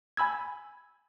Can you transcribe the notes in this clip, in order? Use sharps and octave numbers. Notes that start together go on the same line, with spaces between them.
G#5 B5 E6 G#6